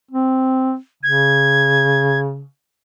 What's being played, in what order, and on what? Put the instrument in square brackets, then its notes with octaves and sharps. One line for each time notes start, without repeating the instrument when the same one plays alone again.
[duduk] C4
[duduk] C#3 [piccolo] G#6